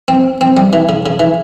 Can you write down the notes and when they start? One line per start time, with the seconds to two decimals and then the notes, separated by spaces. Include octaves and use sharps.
0.08 C4
0.41 C4
0.57 G3
0.73 E3
0.89 C#3
1.06 C#3
1.19 E3